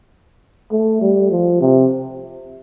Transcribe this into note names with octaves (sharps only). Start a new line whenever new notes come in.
A3
G3
F3
C3